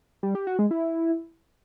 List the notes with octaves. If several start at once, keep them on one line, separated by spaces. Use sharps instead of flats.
G3
G4
F#4
G#3
E4